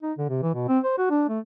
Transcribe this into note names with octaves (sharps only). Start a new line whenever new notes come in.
D#4
D3
C3
E3
B2
C4
C5
F#4
D4
A3